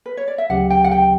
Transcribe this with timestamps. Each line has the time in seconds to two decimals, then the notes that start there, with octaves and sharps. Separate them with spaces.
0.06 B4
0.17 C#5
0.28 D5
0.38 E5
0.50 D2 C#3 F#3 C#4 G4 F#5
0.70 G5
0.84 F#5
0.91 G5